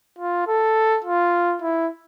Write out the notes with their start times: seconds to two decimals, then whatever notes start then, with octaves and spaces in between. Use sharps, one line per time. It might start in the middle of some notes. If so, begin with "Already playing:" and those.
0.18 F4
0.47 A4
1.04 F4
1.62 E4